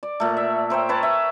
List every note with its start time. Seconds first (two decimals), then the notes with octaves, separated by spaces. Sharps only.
0.03 D5
0.20 A#2 A3
0.37 E5
0.70 A#4 C5 C#5 G5
0.89 B4 C#5 A5 A#5
1.03 E5